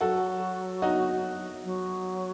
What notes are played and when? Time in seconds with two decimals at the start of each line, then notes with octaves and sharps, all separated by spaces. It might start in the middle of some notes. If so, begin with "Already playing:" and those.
0.01 F#3 F#4 A4
0.82 D#4 F#4
1.64 F#3